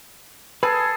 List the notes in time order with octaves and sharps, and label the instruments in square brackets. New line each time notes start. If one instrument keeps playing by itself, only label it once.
[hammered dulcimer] G#4 A4 [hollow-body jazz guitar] B4